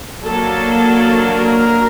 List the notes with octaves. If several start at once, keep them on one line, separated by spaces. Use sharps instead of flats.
F#3 A#3 D4 A4
A#4